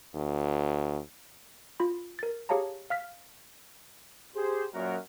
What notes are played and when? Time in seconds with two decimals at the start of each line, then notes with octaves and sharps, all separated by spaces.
0.15 D2
1.80 F4 B5
2.19 A#4 A6
2.49 G4 G#4 C#5 F5 A5 A#5
2.90 F5 F6 B6
4.35 G4 G#4 C5
4.74 F#2 A#2 F#4 A#4